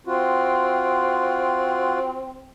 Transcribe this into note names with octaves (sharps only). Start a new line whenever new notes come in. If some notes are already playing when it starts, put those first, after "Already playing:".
C4 F4 F#4